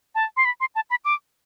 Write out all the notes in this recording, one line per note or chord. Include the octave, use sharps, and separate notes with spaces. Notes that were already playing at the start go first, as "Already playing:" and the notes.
A5
C6
B5
C6
A5
B5
D6